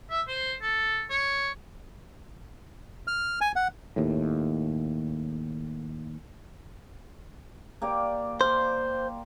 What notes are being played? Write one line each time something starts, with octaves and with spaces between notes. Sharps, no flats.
E5
C5
A4
C#5
F6
G#5
F#5
D#2 A2
A#3 G4 D5
C5 F5 C6